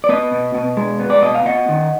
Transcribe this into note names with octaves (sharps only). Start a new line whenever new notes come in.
D5
B3 B4 D#5
B2
B2
G#3
B3
D5
B2 D#5
F5
B3 D#5 F#5
D#3